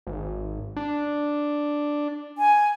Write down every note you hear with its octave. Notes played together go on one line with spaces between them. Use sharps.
G#1
D4
G#5